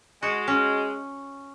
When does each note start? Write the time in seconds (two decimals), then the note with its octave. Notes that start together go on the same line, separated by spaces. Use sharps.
0.23 G#3 F#4
0.47 C#4